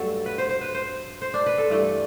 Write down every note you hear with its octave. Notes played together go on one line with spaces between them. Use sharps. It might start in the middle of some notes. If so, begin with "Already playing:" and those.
Already playing: G2 F#3 A3 A4
B4
C5
C5
B4
C5
C5
D4
B4
A4
G2 E3 A3